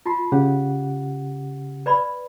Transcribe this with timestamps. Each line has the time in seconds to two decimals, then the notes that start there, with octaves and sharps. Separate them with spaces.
0.06 F4 A5 C6
0.32 C#3 G4 F#5
1.86 B4 D5 B5